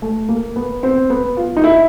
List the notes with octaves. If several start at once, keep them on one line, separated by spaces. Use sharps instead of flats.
A3
A#3
B3
C4
B3
F4
D#4
E4